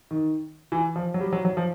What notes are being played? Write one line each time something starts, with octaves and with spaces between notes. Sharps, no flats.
D#3
E3
F3
F#3
G3
F#3
F#3
F3